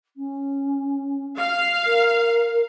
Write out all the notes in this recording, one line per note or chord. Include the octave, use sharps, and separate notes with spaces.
C#4
F5
A#4